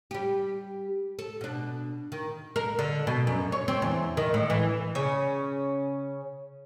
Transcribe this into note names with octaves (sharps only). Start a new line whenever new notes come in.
G3 G4
A4
B2 D4
D#3
A#4
D3
B2
F#2
C#5
C4
E2
D#3
A2
E3
C#3 C#4